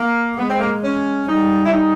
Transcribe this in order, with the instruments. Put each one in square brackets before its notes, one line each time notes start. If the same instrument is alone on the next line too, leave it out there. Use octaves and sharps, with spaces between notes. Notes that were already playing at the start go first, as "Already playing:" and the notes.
Already playing: [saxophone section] A#3
[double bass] G#3 [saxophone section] B3
[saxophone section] C4
A#3
C#4
[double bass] G3 [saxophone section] D#4
[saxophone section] E4
D#4